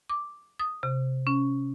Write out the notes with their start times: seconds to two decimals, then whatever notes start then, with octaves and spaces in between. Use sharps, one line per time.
0.09 D6
0.59 D#6
0.83 C3
1.27 C#4